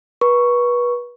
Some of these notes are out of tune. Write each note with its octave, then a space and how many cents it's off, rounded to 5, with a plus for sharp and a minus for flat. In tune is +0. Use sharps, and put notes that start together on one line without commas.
B4 -30 C#6 +0